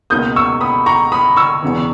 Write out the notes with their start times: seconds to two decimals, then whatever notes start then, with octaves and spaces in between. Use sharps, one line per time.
0.10 C#2 B2 A#3 D#4 D#6 G6
0.36 C#6 E6
0.61 B5 D#6
0.86 A#5 C#6
1.12 B5 D#6
1.37 C#6 E6
1.62 E1 E2 C#3 E3